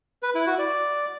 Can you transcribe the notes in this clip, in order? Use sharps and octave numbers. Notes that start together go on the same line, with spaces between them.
B4
E4
F#4
D5